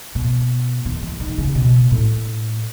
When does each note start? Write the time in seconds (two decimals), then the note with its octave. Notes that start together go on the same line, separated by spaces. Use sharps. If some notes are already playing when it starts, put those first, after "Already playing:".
0.15 B2
0.85 D#3
1.02 E3
1.20 D#3
1.38 C#3
1.55 B2
1.91 A2